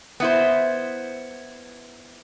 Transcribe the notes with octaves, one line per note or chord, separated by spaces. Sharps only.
B3 E4 C5